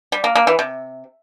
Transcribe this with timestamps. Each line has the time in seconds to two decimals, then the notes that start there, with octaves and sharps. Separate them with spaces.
0.12 G3
0.24 A#3
0.35 A#3
0.47 E3
0.59 C3